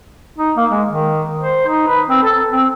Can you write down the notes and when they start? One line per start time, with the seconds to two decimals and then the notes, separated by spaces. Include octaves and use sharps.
0.38 D#4
0.57 A#3
0.71 G#3
0.87 D#3
1.40 C5
1.67 D#4
1.87 B4
2.09 C4
2.23 A4
2.52 C4